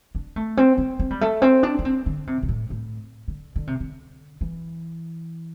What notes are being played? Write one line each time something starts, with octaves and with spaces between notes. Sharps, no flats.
D4
A3
C4
C4
C4
G3
A3
C4
D4
D4
C4
D3
C3
C3
A2
A2
D3
D3
C3
D3
E3